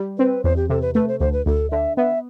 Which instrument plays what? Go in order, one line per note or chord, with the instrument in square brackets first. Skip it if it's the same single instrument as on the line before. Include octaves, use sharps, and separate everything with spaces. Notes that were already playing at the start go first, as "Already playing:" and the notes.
Already playing: [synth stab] G3
[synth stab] C4 [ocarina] B4
[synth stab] E2 [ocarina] C5
[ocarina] G4
[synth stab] C3 [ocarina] A4
[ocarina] B4
[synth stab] A3 [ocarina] B4
[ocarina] C5
[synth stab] D2 [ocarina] C5
[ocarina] B4
[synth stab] D2 [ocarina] A4
[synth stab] D3 [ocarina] E5
[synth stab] B3 [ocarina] E5